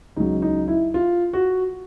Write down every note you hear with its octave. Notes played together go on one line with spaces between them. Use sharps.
C#2 C#3 F#3 D#4
D#4
E4
F4
F#4